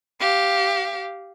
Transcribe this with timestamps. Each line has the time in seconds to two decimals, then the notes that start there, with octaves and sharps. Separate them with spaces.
0.20 G4 F5